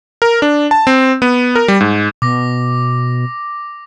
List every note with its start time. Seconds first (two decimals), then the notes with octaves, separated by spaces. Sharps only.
0.22 A#4
0.42 D4
0.71 A5
0.87 C4
1.22 B3
1.55 A#4
1.68 G3
1.80 G#2
2.22 B2 D6 A#6